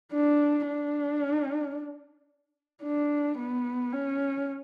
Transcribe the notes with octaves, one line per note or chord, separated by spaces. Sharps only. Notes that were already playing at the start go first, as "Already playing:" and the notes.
D4
D4
D4
B3
C#4